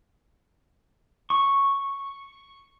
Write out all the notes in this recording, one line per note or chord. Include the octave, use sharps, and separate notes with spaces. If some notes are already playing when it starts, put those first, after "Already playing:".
C#6